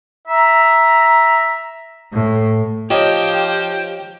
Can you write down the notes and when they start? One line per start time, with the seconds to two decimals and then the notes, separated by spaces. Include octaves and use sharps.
0.28 E5 A#5
2.13 A2
2.90 F3 D#4 G4 C#5 G5